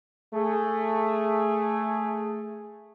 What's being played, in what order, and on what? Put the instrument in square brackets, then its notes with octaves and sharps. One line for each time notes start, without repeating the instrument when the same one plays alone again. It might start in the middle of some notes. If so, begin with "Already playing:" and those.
[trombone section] A3 G#4